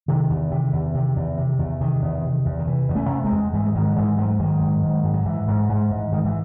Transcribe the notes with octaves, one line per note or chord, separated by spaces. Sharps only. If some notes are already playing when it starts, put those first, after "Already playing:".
C3 D#3
E2
C3
E2
C3
E2
C3
E2
C3 D#3
E2
C3
E2
D#3
C3 E3
E2
A3 C#4
C3
G#3 C4
E2
G#2 E3 G#3
G#3
G#2 D#3 F#3
F#3
G#2 E3 G#3
G#2 F#3 A3
G#2 D#3 F#3
G#2
G#2
G#2
F#3
G#2 E3
G#2
G#2
G#2
G#2 D#3
E3